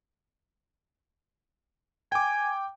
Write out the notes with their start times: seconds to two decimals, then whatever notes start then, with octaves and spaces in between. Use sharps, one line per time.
2.12 G5 G#5 D6